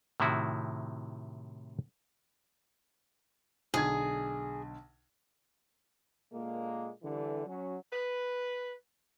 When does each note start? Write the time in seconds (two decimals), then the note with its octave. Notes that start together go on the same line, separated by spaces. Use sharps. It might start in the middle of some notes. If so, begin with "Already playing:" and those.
0.20 A2 C3 D#3 E4 F#4
3.74 B1 D3 G#4 G#6
6.33 A#2 D3 G#3 A#3
7.03 D3 E3 G3
7.46 F#3 C#4 F#4
7.93 B4